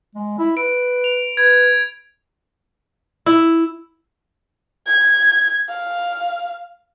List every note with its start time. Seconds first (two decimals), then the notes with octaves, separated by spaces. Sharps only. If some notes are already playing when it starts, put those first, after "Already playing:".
0.15 G#3
0.39 E4
0.57 B4 D7
1.04 F7
1.37 B4 G#6
3.26 E4
4.87 G#6
5.69 F5